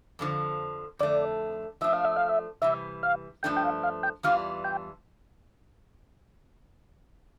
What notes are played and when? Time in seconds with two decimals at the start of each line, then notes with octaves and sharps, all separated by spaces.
0.19 F2 D3 F3
0.99 F2 D3 A3 D5
1.81 F3 A3 D4 E5
1.93 F5
2.05 E5
2.17 F5
2.29 E5
2.62 C3 E3 G3 E5
3.03 F5
3.43 G2 F3 A3 D4 G5
3.57 G5
3.64 F5
3.83 F5
4.03 G5
4.23 E2 E3 G3 D4 F4 F5
4.64 G5